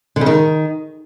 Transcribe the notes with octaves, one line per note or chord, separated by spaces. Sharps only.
D3
C#3
D#3